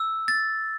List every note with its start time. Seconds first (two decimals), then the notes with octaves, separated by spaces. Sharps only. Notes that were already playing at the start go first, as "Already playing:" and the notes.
Already playing: E6
0.28 A6